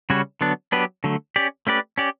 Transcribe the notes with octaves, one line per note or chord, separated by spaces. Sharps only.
C#3 G3 C#4 F#4 C#5
D3 F#3 B3 D4
F#3 B3 D4 G4 B4
D3 F#3 A3
C#4 G4 D5
A3 C#4 G4 B4 D5
C#4 G4 D5